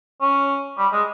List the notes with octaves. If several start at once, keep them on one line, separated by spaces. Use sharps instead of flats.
C#4
G3
G#3